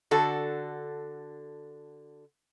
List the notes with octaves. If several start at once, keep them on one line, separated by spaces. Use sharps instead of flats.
D3 F#4 A4